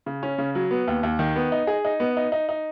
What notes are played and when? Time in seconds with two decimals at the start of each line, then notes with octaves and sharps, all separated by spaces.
0.06 C#3
0.23 C#4
0.38 C#3
0.55 F#3
0.71 B3
0.88 D#2
1.03 D#2
1.19 D#3
1.36 B3
1.52 D#4
1.67 G#4
1.85 D#4
2.00 B3
2.17 D#4
2.32 D#4
2.49 D#4